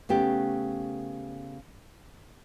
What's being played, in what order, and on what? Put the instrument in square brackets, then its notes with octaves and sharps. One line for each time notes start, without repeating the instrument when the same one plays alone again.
[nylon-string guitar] C#3 A3 B3 G4